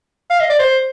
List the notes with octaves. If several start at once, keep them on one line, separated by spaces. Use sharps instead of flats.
F5
D#5
D5
C5